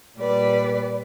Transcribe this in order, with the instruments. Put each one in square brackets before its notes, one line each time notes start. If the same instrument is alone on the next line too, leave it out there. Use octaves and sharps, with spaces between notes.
[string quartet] A#2 G3 B4 D5